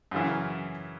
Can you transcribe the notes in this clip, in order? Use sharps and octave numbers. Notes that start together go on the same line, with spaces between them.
F#2 C#3 E3